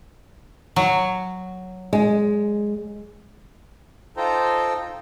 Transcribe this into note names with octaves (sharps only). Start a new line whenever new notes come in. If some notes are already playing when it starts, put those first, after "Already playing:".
F#3
G#3
D#4 F4 A4 C5 G5 A#5